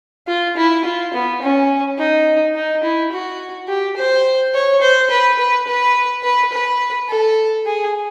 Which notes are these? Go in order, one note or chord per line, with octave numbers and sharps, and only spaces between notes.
F4
E4
F4
B3
C#4
D#4
D#4
E4
F#4
G4
C5
C#5
C5
B4
B4
B4
B4
B4
A4
G#4